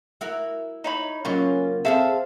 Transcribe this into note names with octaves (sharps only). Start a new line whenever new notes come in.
E4 F#4 A#4
D#4 C#5 B5
C#3 F#3 A#3 C#4 F4 C#6
C4 G#4 A4 C5 E5 F5 A5